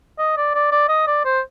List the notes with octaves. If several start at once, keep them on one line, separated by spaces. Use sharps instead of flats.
D#5
D5
D5
D5
D#5
D5
C5